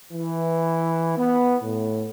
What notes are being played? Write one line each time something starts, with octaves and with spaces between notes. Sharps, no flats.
E3
B3
A2